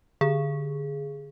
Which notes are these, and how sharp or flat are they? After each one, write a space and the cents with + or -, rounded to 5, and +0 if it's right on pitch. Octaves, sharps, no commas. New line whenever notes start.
D3 +0 G#4 +0